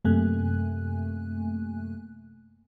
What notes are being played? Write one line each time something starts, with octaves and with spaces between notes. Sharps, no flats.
F#2 C3 A3 A#3 G#5 F#6